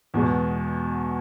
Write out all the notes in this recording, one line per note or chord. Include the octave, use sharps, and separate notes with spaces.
E2 B2 G#3